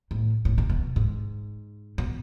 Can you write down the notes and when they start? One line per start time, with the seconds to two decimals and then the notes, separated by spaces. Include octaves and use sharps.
0.11 A2
0.45 A2
0.58 B2
0.70 B2
0.96 G#2
1.98 B2